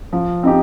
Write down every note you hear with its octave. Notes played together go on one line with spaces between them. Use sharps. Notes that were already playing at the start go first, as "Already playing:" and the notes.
F3
C4 D#4 G4